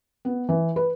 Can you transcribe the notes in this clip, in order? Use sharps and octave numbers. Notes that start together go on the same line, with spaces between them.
B3
E3
B4